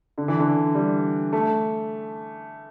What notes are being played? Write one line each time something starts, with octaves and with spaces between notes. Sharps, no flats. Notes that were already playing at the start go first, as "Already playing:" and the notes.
D3
E3
D3
G3
A3